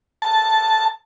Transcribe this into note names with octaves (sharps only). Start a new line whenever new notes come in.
A5